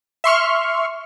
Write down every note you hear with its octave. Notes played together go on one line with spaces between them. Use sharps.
E5 C6 C#6 F6